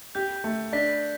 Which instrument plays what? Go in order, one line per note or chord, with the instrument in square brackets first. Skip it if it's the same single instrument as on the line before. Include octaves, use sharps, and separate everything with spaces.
[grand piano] G4 [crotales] G6
[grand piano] A3
[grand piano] D4 [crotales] B6